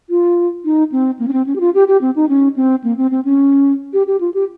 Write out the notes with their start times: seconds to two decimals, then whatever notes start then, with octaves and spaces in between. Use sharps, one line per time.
0.10 F4
0.65 D#4
0.92 C4
1.19 A#3
1.28 C#4
1.33 C4
1.46 C#4
1.56 G4
1.60 F4
1.74 G4
1.88 G4
2.01 C4
2.16 D#4
2.29 C#4
2.56 C4
2.84 A#3
2.97 C4
3.11 C4
3.25 C#4
3.93 G4
4.07 G4
4.21 F4
4.34 G4